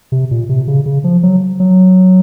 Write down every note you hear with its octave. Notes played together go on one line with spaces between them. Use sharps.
C3
A#2
C3
C#3
C#3
F3
F#3
F#3